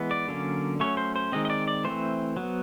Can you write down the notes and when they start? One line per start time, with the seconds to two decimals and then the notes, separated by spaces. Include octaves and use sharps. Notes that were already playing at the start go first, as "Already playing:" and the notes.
Already playing: E3 G#3 B3
0.11 D5
0.28 D3 F#3 A#3 C#4
0.80 F#3 A3 C#4 C#5
0.97 C5
1.16 C5
1.32 D#3 G#3 C4 D#5
1.45 D#5
1.50 D5
1.68 D5
1.84 E3 A3 C4 C5
2.37 F#3 B3